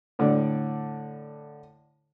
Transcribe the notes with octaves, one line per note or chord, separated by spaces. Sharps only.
A2 D3 D5